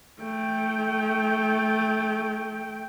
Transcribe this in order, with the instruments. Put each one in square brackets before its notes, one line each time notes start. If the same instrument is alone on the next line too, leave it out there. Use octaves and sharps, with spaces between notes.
[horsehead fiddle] A3 G5